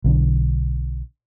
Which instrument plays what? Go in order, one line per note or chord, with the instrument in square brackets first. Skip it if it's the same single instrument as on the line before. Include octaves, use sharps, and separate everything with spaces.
[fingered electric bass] B1 D3 D4